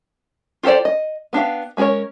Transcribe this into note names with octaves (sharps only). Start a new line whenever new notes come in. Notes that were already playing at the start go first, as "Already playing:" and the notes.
F4 G4 A4 C5 D5
D#5
B3 D4 G4 F5
G#3 C#4 G#4 A#4 C#5